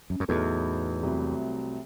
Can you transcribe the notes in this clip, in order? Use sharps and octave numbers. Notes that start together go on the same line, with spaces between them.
F#2
F#2
E2 A2 F#3 B3 D#4 A4
C2 C3 F#3 A3